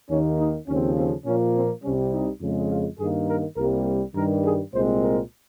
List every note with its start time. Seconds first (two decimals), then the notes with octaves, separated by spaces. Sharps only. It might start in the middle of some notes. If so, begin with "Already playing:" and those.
0.09 D#2 D#3 A#3 C#4
0.38 D#4
0.67 D#2 C#3 F3 C4 C#4
0.96 C4
1.25 A#2 F3 A#3 C#4
1.54 C4
1.83 C2 C3 G3 C#4
2.12 D#4
2.41 F2 C#3 G#3
2.70 F4
2.98 G2 D#3 A#3 G#4
3.27 A#4
3.56 C2 C3 G3 A#3 A#4
4.15 G2 D#3 G3 A#4
4.43 G#4
4.72 C2 A#2 G#3 C4 C5
5.01 A#4